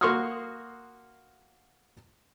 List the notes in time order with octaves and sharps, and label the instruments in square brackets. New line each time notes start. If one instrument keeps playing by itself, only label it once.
[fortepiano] A#3 F#4 C6 C#6 D#6 F6